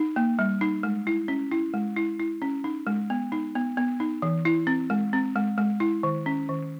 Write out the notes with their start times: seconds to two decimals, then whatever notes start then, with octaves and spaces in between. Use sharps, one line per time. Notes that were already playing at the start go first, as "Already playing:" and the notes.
Already playing: D#4
0.16 A#3
0.39 G3
0.61 D#4
0.83 G#3
1.07 E4
1.28 C#4
1.52 E4
1.74 G#3
1.97 E4
2.19 E4
2.42 C#4
2.64 D#4
2.87 G#3
3.10 B3
3.32 D#4
3.55 B3
3.77 B3
4.00 D#4
4.22 E3
4.45 E4
4.67 C4
4.90 G#3
5.13 C4
5.36 G#3
5.58 G#3
5.80 E4
6.03 D#3
6.26 C#4
6.49 D#3